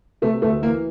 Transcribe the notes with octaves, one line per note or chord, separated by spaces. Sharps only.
C3 A3
D2 A3
E3 A#3